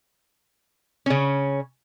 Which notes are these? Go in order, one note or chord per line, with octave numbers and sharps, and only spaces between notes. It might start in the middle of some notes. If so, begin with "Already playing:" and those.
C#3 C#4